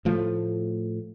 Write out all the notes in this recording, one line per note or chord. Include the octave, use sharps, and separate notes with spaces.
A2 F3 A3